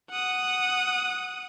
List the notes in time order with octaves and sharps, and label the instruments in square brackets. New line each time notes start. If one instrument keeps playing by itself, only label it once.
[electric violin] F#5 D#6